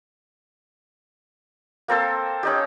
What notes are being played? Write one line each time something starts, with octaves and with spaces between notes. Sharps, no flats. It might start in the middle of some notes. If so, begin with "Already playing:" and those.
A#3 C4 A4 C5
C#4 D#4 G4